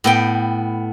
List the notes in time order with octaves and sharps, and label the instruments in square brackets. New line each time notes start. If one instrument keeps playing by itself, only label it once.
[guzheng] A2 B3 G5